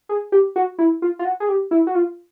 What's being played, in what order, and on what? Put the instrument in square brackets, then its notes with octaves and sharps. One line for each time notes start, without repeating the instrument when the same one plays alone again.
[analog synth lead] G#4
G4
F#4
E4
F4
F4
F#4
G#4
G4
E4
F#4
F4